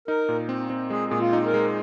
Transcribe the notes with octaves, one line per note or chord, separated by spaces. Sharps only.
D#4 A#4
A#2
C4
C4
G#3 G#4
A#2 G#4
F4
D#4
A#4
G#3